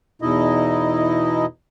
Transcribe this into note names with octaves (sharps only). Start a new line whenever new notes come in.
E2 B2 D#4 E4 D#5